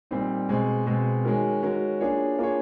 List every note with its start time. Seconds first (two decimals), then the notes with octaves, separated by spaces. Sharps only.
0.11 A#2 G3 C4 D#4
0.49 B2 G#3 C4
0.86 B2 G#3 C4
1.25 D#3 G#3 C#4 F#4 A#4
1.63 D#3 G#3 C#4 F#4 A#4
2.01 A#3 D4 F4 G#4 C#5
2.39 A#3 D4 F4 G#4 C#5